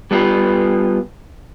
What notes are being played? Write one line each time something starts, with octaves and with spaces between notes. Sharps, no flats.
G3 B3 E4 F4 G4 B4